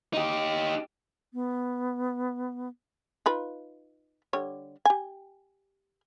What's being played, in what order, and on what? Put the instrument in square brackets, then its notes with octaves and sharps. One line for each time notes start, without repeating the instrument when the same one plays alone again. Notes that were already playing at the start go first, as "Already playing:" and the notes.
[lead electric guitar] D#4 G4
[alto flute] B3
[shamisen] D#4 F4 B4
D3 G3 C#5
G4 G#5